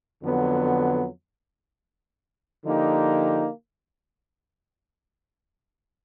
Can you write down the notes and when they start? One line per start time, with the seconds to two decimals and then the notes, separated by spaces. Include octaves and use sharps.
0.22 F2 D3 F#3 B3
2.64 D3 F3 A#3 D#4 G4